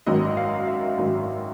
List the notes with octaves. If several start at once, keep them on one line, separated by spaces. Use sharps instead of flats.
G#1 F#2 D#3 F#3 D#5
F5
E5
G#1 F#2 D#3 F#3